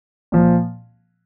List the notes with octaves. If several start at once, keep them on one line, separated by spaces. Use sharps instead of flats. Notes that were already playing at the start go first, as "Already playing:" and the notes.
A#2 F3